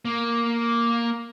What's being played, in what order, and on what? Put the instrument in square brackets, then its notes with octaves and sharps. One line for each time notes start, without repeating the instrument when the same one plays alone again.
[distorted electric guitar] A#3